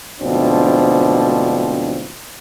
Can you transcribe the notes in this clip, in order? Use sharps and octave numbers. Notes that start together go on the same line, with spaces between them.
D2 G#2 B2 F3 C4 D4